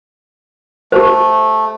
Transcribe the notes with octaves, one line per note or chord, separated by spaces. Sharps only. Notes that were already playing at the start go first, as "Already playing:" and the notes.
A3 G4 C5